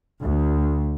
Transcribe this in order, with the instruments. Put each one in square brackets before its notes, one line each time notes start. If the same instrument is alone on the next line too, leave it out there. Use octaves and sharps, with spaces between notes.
[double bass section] D2